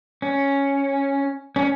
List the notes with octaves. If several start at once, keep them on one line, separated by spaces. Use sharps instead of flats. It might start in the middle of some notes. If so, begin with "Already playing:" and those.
C#4
C#4